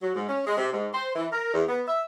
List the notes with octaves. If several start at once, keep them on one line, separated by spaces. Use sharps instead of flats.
F#3
G#2
C#4
G#3
C3
G#2
C5
E3
A#4
E2
B3
E5